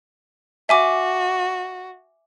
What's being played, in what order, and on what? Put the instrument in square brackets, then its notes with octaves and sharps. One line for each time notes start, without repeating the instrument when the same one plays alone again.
[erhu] F#4 [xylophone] E5 G#5 D6